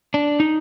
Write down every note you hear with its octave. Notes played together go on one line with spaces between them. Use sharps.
D4
D#4